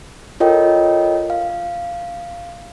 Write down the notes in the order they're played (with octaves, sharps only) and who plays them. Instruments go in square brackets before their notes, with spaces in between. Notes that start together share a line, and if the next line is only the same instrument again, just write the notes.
[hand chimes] F4 A4 A#4 C#5 D#5 G5
F5